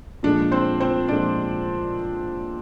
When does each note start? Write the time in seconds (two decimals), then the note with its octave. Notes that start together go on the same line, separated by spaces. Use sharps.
0.23 A#2 F3 G#3 D4
0.51 C4 C5
0.80 C4 C5
1.08 A#2 F3 G#3 D4 D5